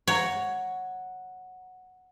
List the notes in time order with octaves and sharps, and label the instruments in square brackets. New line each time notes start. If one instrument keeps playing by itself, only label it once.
[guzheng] C#5 [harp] F#5 A#5